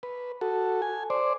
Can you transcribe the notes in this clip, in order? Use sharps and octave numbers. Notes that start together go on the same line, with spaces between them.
B4
F#4 A4
G#5
C5 D5